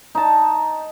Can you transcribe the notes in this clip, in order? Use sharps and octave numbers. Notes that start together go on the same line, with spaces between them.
D#4 A5